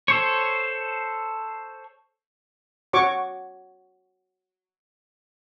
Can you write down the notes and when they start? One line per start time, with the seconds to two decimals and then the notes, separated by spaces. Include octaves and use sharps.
0.08 A4 C5 C#5
2.93 F#4 C#5 C#6 D6